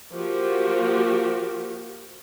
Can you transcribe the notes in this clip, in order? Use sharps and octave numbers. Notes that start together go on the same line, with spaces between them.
F3 A#3 F#4 G4